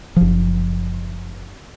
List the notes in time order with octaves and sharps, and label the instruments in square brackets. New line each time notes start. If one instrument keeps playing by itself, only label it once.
[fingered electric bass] F#1 F3